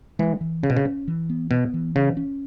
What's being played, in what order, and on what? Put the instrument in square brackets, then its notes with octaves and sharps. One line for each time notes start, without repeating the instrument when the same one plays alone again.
[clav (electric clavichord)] E3 [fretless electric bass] G#3
[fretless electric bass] E3
[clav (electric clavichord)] C#3 [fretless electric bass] C#4
[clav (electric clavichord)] B2
C#3
[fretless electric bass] C#4
E3
B3
[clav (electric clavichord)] B2 [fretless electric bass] B3
[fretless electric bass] E3
[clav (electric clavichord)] C#3 [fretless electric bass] C#4
[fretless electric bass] C#4